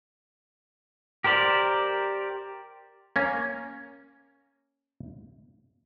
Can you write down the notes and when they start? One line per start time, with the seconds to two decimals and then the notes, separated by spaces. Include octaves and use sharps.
1.24 G4 A#4 C5 D5
3.16 A#3 C#4